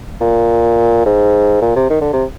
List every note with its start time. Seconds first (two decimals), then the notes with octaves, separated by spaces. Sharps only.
0.21 A#2
1.06 G#2
1.62 A#2
1.76 C3
1.90 D#3
2.02 D3
2.13 C3